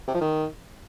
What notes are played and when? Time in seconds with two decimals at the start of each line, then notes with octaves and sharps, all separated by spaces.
0.08 C3
0.14 F3
0.21 D#3